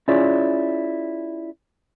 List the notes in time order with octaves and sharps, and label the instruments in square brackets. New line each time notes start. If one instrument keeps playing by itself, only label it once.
[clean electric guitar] C#4 E4 F4 G#4 C#5 D5